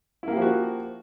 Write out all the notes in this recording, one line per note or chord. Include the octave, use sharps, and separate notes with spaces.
F3 A#3 E4 F#4 G4